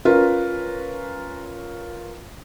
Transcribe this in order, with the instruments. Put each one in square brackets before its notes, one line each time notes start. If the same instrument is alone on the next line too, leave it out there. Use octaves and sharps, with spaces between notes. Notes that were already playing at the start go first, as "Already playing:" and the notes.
[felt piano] C#4 F4 A#4 B4